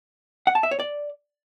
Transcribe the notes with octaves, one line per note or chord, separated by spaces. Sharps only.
F#5
A5
E5
C#5
D5